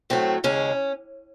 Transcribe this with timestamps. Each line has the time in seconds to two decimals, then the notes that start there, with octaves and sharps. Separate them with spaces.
0.10 A2 F#3 A3 C4
0.44 D#2 C#3 G#3 C#4